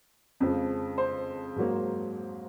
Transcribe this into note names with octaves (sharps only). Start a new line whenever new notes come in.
F2 C#3 F3 G#3
C5
G#2 F#3 A#3